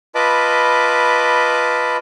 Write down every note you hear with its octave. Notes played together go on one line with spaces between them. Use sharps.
F4 B4 D#5 A5 B5 D6